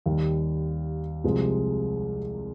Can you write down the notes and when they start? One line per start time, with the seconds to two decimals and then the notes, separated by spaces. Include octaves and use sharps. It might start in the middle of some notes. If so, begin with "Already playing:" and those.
0.06 D#2 D#3 G3
1.24 C2 C3 F3 G#3